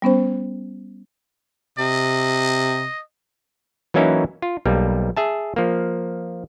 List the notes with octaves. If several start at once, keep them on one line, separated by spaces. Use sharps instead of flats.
G3 B3 C#4 C5
C3 D#5
E3 F#3 A#3 C#4 D#4 E4
F4
B1 G3 A#3
G#4 E5 A5
F3 A#3